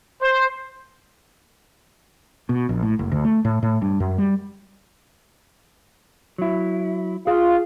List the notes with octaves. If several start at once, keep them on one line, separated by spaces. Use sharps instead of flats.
C5
B2
A#1
A2
F#1
D2
A3
A2
A2
G2
F#2
G3
F#3 E4
F4 G#4 F5